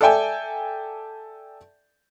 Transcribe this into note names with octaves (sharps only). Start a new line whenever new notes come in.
A4 D5 E5 G5 G#5